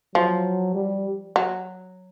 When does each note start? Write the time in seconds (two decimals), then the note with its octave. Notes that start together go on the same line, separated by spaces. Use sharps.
0.15 F3 F#3
0.75 G3
1.36 F#3